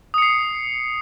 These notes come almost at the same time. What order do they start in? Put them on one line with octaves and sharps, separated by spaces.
D#6 C#7 C7